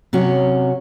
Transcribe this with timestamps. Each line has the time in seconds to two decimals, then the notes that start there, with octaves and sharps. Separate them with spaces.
0.13 C3 F#3 C#4 F#4